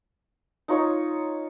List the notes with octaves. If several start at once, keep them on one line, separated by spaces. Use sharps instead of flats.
D#4 F4 C#5